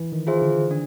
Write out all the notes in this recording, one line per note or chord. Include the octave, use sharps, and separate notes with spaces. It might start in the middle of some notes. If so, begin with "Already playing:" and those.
Already playing: E3
D#3
F4 G#4 C5 E5
D3
D4